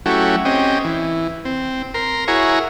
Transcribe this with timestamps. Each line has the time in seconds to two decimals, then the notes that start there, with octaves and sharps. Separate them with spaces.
0.06 F#3 A3 C#4 E4 F#4 G4
0.45 C4 C#4 G4 D#5
0.84 E3
1.45 C4
1.94 A#4 C6
2.28 E4 F#4 G#4 A#4 C#5